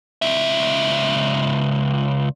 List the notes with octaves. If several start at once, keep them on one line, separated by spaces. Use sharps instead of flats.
C#2 E5